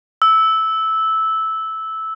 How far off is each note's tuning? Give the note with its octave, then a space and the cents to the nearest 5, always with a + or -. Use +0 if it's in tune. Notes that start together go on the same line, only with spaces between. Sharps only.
E6 -10